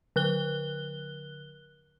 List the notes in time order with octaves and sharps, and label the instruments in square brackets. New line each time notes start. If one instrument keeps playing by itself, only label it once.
[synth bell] D3 F#6 G7